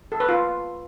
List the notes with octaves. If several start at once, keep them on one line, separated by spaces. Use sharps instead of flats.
A4
B4
F4